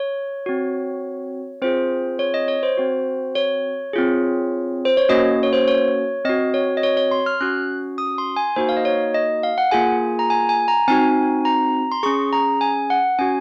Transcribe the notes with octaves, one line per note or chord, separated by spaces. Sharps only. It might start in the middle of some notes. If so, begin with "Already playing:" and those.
Already playing: C#5
C4 F#4
C4 F4 G#4 C5
C#5
D#5
C#5
C5
C4 F#4
C#5
C4 F4 G#4
C5
C#5
A#3 C#4 F#4 D#5
C#5
C5
C#5
C4 F#4 D#5
C#5
D#5
C#5
C#5
C6
F6
C#4 F#4 F#6
D#6
C6
G#5
A#3 D#4 F#4 C5
F5
D#5
C#5
D#5
F5
F#5
A#3 F4 G#4 G#5
A#5
G#5
G#5
A#5
C4 D#4 F#4 G#5
A#5
C6
C#4 G#4 C#6
A#5
G#5
F#5
C#4 F#4 G#5